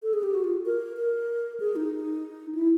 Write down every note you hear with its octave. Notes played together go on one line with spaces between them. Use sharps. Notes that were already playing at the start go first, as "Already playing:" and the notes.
A4
G#4
G4
F#4
F4
A#4
A#4
G#4
D#4
E4